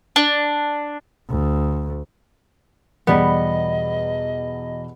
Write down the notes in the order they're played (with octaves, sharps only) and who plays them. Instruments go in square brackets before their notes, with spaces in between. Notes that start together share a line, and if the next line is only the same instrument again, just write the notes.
[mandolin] D4
[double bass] D2
[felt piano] E2 B2 B5 [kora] G3 B3 [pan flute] D#5